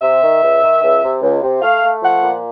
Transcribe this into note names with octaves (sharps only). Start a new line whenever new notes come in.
C3 E5
D#3
C#2
D#3
C#2
C3
C#2
C3
A3 F5
A3
F3 F#5
A#2